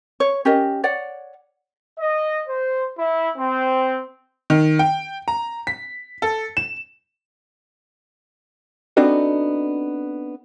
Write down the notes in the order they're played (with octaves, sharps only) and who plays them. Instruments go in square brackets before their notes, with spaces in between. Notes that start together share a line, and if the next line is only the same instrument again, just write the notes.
[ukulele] C#5
C#4 G4 A#4 D#5
C#5 D5 F#5
[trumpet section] D#5
C5
E4
C4
[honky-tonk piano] D#3
G5
A#5
B6
A4
E7
[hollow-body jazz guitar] B3 C4 D4 D#4 F#4 A4